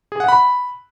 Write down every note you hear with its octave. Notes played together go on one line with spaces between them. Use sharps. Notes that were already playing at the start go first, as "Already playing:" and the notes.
G#4
F#5
B5